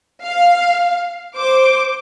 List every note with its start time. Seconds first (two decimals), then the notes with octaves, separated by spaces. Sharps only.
0.23 F5
1.36 C5 D6